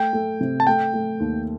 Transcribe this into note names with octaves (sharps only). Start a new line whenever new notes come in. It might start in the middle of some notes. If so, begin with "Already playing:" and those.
Already playing: A3 G5
A3
C3
A5
A3 G5
A3
D#2